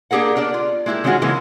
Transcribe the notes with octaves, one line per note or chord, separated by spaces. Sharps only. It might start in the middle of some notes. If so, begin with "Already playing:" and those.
A#3 D4 G4 G#4 A#4 F#5
B3 D4 A#4 D5
F4
G#3 A#3 E4 F#4 G4
D#3 G#3 C#4 F4 F#4 G#4
C#3 E3 F3 G#3 A#3 C#4